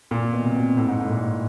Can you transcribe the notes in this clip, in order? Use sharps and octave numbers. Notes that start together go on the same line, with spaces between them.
A#2
B2
C3
B2
A2
G#2
A2
A#2